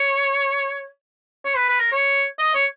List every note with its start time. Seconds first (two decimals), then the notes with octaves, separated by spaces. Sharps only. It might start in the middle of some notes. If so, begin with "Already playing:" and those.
Already playing: C#5
1.45 C#5
1.56 B4
1.69 B4
1.80 A#4
1.92 C#5
2.39 D#5
2.55 C#5